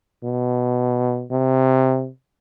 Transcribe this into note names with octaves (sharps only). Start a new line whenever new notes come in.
B2
C3